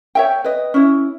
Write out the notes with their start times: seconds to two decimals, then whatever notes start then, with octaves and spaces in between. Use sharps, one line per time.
0.15 C#5 E5 G5
0.45 B4 D#5
0.74 C#4 E4